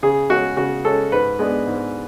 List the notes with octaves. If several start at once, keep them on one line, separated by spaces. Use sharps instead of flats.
C#3 G#4
G#3 C#4 F#4
C#3 F#4
G#3 C#4 A4
G#2 B4
G#3 B3 D4
G#2